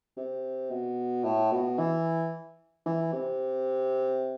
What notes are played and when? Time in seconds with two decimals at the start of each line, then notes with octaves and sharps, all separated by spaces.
0.17 C3
0.70 B2
1.24 A2
1.52 B2
1.78 E3
2.86 E3
3.13 C3